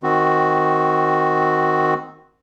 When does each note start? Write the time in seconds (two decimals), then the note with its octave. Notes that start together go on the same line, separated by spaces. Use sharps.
0.03 D#3 C4 F#4